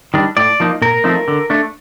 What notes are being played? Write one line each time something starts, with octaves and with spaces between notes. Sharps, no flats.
D#3 G3 D4
A2 D5
F3 A#3 D#4
A#2 A#4
F3 A3 C4 D#4
D3
A3 D4